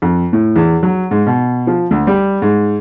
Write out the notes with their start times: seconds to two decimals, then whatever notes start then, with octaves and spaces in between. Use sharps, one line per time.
0.02 F2
0.33 A2
0.56 E2
0.83 F#3
1.11 G#2
1.27 B2
1.67 F3
1.91 D2
2.07 G3
2.42 G#2